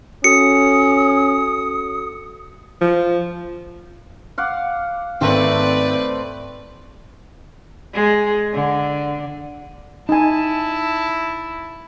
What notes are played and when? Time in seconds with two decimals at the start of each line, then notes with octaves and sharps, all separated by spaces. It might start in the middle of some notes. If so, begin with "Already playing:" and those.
0.24 C#4 F#4 A4 D#6 C#7
2.81 F3
4.38 F5 F#5 D6
5.21 G#1 A3 C4 B4 D5
7.94 G#3
8.53 D3
10.09 D#4 E4 G#5 A5